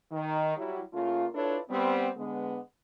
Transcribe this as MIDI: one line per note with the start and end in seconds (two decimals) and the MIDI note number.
0.12 0.57 51
0.57 0.80 54
0.57 0.80 55
0.57 0.80 64
0.93 1.27 49
0.93 1.27 57
0.93 1.27 58
0.93 1.27 65
1.35 1.59 62
1.35 1.59 64
1.35 1.59 65
1.35 1.59 69
1.35 1.59 71
1.35 1.59 73
1.70 2.10 55
1.70 2.10 59
1.70 2.10 60
2.17 2.59 50
2.17 2.59 56
2.17 2.59 59